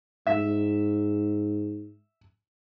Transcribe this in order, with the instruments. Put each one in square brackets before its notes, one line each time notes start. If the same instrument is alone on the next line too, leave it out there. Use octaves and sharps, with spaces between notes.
[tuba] G#2 [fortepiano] E5